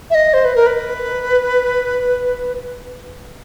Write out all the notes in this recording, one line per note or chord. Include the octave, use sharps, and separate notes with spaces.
E5
D#5
C5
B4
A#4
B4